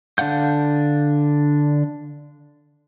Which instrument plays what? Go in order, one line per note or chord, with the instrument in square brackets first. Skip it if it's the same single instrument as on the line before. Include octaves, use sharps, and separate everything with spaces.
[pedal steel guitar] D3 D4 F5 F#5 G6